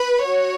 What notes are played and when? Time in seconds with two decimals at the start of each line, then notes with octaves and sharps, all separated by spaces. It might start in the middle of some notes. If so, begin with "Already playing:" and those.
Already playing: B4
0.26 F#4 C#5